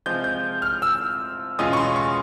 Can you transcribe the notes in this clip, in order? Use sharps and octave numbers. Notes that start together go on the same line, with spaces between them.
C3 F3 G#3 C4 F4 G6
G6
F6
E6
E2 B2 G#3 C#4 F4 D#6
C#6
C6
C#6